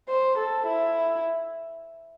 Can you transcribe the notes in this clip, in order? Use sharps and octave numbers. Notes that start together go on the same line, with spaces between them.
C5
A4
E4